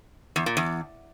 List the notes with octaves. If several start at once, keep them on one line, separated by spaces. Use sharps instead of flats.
E2
A#2
E2